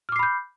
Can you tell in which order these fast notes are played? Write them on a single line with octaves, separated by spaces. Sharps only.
F6 D6 C7 B5 G6